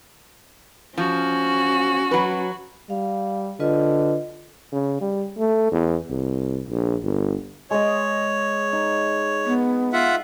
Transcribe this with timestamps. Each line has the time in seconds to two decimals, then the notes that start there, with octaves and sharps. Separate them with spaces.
0.98 F3 C#4 F#4
2.11 F#3 B4
2.90 G3 F5
3.60 D3 F4 B4 D#5
4.72 C#3
5.01 G3
5.39 A3
5.72 E2
6.10 C2
6.68 A#1
7.03 G1
7.71 G#3 C#5 D#5
8.73 D#4
9.45 B3
9.93 F4 E5 F#5